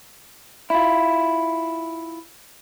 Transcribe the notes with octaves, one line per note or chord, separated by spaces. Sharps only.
E4 F4